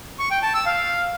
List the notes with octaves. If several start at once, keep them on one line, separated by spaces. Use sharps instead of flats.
C#6
G5
A5
E6
F5